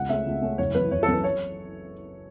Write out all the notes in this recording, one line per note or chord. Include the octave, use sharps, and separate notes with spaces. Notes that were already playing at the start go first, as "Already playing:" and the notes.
Already playing: C#2 F#5
C#3 A3 C#4 E5
C#2
C#3 A3 C#4
F#1 C#5
F#2 E3 B4
F#1 C#5
A4
F#2 E3 B4
C#5